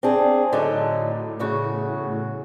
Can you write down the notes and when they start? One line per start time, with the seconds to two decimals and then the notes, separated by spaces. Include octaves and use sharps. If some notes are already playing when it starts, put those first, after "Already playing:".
0.03 C4 D4 G#4
0.53 A2 D3 F#3 D#4
1.40 E2 C#3 F#4